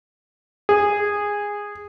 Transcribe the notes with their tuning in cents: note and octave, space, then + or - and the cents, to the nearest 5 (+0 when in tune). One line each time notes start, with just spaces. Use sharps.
G#4 -15